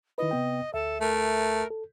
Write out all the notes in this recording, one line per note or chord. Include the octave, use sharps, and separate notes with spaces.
D#3 E4 B4 D#5
C3 B3 G5
D2 A4 E5
A3 A#4
A4